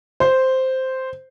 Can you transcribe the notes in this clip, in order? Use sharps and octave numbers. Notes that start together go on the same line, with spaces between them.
C5